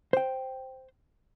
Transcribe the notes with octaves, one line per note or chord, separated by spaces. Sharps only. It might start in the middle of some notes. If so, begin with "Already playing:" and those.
C5 G5